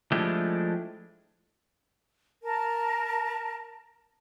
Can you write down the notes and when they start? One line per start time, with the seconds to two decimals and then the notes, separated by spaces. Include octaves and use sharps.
0.12 F3 G#3 A3 D4 E4 G4
2.42 A#4 A5